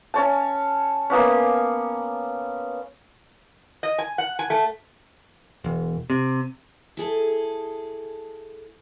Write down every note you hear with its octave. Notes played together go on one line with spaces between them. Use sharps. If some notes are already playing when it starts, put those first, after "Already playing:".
C#4 C#5 A5
A#3 B3 C#4
D#5
G#5
F#5
G#5
A3
E1
C3
E4 G#4 A4